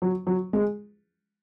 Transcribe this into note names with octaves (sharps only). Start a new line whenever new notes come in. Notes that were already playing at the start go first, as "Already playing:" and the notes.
F#3
F#3
G#3